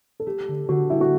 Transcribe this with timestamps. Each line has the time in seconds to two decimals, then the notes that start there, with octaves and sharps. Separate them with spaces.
0.20 A4
0.26 A3 G4
0.48 D3
0.69 D3 F#4
0.90 G3 E4
1.01 F#4